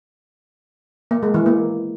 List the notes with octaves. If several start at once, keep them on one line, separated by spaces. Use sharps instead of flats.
A#3
G#3
E3
A#3